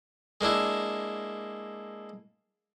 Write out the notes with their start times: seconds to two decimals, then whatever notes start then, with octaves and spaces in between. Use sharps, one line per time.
0.41 G#3 A#3 D4 E4